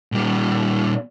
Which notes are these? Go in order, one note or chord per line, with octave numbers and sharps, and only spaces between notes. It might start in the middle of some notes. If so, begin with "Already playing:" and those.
A#2 G3